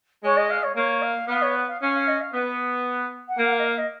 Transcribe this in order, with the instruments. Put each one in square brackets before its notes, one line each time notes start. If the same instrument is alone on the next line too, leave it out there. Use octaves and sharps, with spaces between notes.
[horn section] G#3 [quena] C#5
[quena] D#5
F5
C#5
[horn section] A#3 [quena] C#5
[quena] F5
[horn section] B3 [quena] F5
[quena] C#5
F5
[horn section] C#4 [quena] F5
[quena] F5
D#5
F5
[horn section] B3
[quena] F#5
[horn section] A#3 [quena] F5
[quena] F#5
F5
D#5
F5
D#5